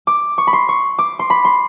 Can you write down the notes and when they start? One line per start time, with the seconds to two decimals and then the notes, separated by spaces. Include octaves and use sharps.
0.07 D6
0.38 C#6
0.47 B5
0.53 C6
0.69 C#6
0.98 D6
1.19 C6
1.30 B5
1.45 C6